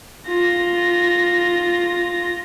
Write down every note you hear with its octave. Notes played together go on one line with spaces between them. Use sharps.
F4 A#6